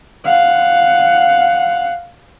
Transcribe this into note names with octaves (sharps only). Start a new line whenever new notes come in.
F5 F#5